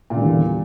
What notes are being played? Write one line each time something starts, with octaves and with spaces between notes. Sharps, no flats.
E2 A#2 D3 G3